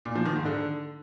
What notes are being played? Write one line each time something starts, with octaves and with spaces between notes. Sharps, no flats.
A#2
F3
D#3
G#2
D3